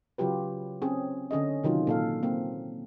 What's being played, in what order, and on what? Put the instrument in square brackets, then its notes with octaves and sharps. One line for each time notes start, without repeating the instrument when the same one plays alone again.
[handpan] C#3 F#3 F4 G4 B4
C4 C#4 G#4
D3 C#4 G#4 D#5
C3 D#3 F#3 F4
A#2 A4 F5
A#3 C4